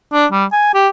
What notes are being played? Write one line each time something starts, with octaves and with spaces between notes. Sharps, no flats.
D4
G3
G#5
G4